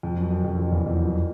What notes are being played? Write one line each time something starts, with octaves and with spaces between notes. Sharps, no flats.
F2
F#2
F#2
F2
F2
E2
F2
F#2